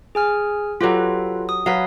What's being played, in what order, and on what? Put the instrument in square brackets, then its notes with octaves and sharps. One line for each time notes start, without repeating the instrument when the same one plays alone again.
[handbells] G#4 G#5 F6
[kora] F#3 G4 [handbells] F4 A4 B4
[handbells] D#6
[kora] F#3 B4 [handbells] F5